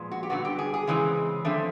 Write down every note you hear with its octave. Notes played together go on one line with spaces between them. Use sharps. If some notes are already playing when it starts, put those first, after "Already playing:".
Already playing: A#2 F3 G#3 B3
F#4
G4
G2 D3 F#3 B3 F#4
G4
G#4
G#4
C#3 E3 G#3 C4
D3 F3 A3 C4